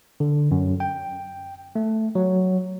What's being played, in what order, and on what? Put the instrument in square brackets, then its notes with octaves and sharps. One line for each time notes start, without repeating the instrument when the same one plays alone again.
[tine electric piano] D3
F#2
G5
A3
F#3